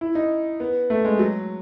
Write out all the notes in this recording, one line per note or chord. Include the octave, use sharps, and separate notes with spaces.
E4
D#4
B3
A3
G#3
F#3